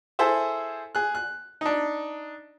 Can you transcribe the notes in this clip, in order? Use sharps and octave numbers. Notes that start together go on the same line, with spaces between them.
E4 G#4 A4 C5 E5
G#4 F#6
F#6
D4 D#4